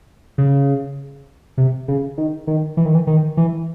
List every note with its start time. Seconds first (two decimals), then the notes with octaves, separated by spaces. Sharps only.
0.38 C#3
1.58 C3
1.88 C#3
2.18 D#3
2.47 D#3
2.77 E3
2.86 D#3
2.95 E3
3.07 D#3
3.37 E3